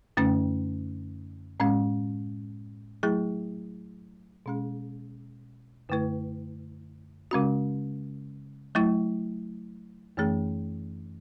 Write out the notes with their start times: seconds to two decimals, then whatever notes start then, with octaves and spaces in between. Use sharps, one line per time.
0.17 F#2 D3 A3 C#4
1.60 A2 G#3 C#4
3.03 F#3 A3 E4 G#4
4.46 B2 G#3 C#4 G#4
5.89 F#2 D3 A3 E4 B4
7.31 C#3 G#3 C#4 F#4
8.75 F#3 A3 E4
10.17 F#2 E3 A3 C#4 G#4